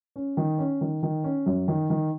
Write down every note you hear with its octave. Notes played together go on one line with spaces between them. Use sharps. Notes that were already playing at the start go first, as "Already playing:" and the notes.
C#4
D#3
C#4
D#3
D#3
C#4
F#2
D#3
D#3